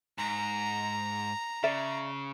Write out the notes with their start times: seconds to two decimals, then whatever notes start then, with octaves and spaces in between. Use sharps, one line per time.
0.18 G#2 A#5
1.64 C#3 D5 E5